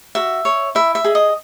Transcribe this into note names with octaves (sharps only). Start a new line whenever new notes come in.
F#4 E5
C#5
E4 E5
E5
G#4 D#5
D#5